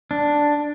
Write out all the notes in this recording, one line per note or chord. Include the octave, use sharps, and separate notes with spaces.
D4